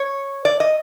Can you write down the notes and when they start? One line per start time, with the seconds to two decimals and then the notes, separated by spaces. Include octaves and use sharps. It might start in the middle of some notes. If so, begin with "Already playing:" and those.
Already playing: C#5
0.45 D5
0.60 D#5